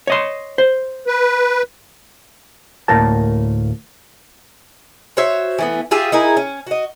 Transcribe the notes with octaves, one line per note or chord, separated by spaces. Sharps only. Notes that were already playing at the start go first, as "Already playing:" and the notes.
C#5 D#5 C6
C5
B4
D2 A2 A#3 A#4 A5
F#4 C5 C#5 E5
E3 A3 B3
F4 G4 G#4 E5
D#4 E4 G#4 A#4
C#4
F#4 D#5